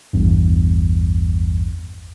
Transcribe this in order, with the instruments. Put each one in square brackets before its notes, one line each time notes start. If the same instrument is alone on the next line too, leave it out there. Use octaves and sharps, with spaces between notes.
[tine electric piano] A1 E2 G2